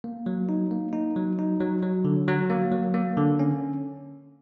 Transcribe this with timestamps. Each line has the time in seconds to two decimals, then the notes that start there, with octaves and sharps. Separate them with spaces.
0.04 A#3
0.26 F#3
0.49 D#4
0.71 A#3
0.93 D#4
1.16 F#3
1.39 D#4
1.60 F#3
1.83 F#3
2.05 D3
2.28 F#3
2.50 A#3
2.71 F#3
2.94 A#3
3.17 D3
3.39 C#4